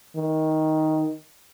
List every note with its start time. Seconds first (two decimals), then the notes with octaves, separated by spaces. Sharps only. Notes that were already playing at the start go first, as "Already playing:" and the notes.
0.16 D#3